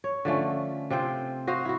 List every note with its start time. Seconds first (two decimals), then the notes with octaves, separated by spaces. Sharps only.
0.04 C#5
0.25 D3 F3 A3 C#4
0.90 C3 C4 F4 G5
1.47 F#4 C5 D#5 F5
1.65 E4 F#4